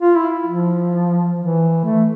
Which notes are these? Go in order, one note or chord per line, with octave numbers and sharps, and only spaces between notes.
F4
E4
F3
E3
A3